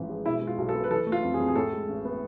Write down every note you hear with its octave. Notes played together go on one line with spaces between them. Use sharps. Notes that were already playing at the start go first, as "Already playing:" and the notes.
Already playing: A1 G#2 E3 F3
G#3
B2 E4
G#3
F4
B1
A4
B3
B4
E3 A4
A3
F4
F2
G#4
F2
G#4
A2 A4
G#3
A1
B3